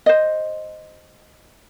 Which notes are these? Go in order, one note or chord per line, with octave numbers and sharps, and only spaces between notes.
C5 D#5